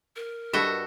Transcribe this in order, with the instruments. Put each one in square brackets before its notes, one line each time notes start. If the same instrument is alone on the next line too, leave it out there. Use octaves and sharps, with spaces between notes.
[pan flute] A#4
[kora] G2 A4 [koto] F#4 D#5 E5